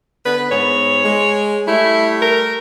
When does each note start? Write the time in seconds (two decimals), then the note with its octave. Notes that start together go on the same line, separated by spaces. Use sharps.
0.25 D3 B3 B4
0.51 G#2 B3 C#5
1.05 G#3
1.67 G3 A3 E4
2.22 A#4